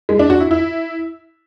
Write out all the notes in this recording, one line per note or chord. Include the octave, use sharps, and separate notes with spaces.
G#3
D4
F#4
E4
E4